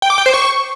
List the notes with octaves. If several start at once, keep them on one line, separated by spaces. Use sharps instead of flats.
G5
D6
G5
C5
C#6